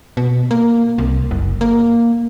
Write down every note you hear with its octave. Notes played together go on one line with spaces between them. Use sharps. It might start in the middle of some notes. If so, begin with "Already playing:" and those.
B2
A#3
C2
F#1
A#3